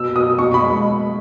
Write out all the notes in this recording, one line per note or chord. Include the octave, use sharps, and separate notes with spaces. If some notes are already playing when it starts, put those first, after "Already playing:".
Already playing: B2 E6
B2 D#6
B2 C#6
B5
G#3